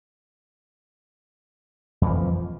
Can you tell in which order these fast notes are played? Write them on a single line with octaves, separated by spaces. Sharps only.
F2 E3 F3